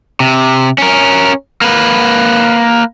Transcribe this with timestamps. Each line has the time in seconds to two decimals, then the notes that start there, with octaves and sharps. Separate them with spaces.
0.20 C3
0.78 C#4 A#4
1.61 A#3 B4